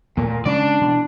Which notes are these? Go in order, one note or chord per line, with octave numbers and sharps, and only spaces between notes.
D#2 A#2 A3
C#3 G#3 C#4 D4 D5
B2 E3